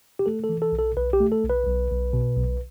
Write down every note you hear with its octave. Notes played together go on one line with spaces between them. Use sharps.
G4
A3 A4
A4
E3
A4
B1
A4
B1 B4
G4
A3
A4
B1
B4
B1
B1
B2
B1